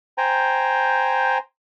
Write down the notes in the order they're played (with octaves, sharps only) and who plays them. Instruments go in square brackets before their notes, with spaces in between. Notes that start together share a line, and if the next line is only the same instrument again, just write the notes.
[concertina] C5 G5 G#5 A#5